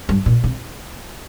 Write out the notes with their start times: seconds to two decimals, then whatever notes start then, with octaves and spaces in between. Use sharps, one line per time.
0.09 G2
0.26 A#2
0.44 C3